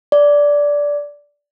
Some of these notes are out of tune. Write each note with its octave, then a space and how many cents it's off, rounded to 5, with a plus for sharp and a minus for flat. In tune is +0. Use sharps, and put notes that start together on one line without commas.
D5 -10